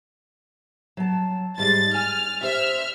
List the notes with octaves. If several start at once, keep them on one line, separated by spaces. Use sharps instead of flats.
F#3 A5
G#2 G3 G#3 A6
G#5 F6
G4 C5 E5 F6